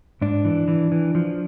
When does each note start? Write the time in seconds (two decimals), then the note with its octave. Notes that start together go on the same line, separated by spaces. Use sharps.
0.21 G#2 D4
0.45 E3
0.68 E3
0.92 E3
1.15 F3